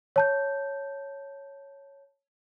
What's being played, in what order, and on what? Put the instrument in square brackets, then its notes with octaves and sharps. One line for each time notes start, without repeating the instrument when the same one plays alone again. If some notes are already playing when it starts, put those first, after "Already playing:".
[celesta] C#5 A5 G6